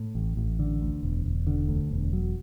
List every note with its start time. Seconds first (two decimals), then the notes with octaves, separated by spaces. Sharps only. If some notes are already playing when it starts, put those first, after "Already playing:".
Already playing: A2
0.15 A1
0.37 A1
0.59 D3
0.82 D2
1.03 E1
1.26 E1
1.47 D3
1.68 D2
1.91 E1
2.13 F#3